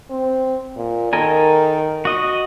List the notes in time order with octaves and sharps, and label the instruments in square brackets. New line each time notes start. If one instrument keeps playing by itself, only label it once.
[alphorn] C4
A#2
[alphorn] D#3 [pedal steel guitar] A4 A#4 G#5
[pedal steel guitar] F#4 D#5